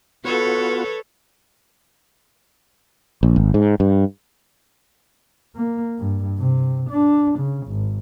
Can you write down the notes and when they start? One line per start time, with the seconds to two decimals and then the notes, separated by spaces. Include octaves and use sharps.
0.24 B3 F4 F#4 A4 B4 C#5
3.23 A#1
3.36 G#1
3.54 G#2
3.80 G2
5.56 A#3
5.98 G2
6.38 C3
6.90 D4
7.38 C#3
7.67 G#1